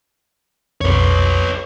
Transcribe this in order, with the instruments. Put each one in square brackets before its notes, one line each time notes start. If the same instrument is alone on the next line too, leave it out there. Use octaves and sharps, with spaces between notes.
[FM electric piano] B1 F2 [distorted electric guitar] B4 C#5